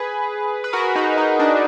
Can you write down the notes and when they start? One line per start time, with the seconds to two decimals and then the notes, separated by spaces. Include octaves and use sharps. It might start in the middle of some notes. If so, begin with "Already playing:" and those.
Already playing: G#4 B4
0.64 B4
0.73 F#4 A#4
0.96 D#4 F#4
1.17 D#4
1.40 D4